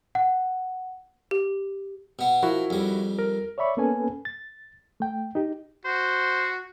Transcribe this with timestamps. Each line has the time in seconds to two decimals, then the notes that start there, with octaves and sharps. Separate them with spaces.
0.15 F#5
1.31 G4
2.19 B2 B3
2.43 F3 E4 F#4 A#4
2.70 F2 G3
3.19 A#4
3.58 C#5 D5 E5 B5 C#6
3.77 A#3 B3 C#4 A4 B4 G#5
4.25 A6
5.00 A3 G5
5.35 D#4 G4
5.85 F#4 C5